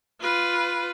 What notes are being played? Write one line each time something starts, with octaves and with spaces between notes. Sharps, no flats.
F4 B4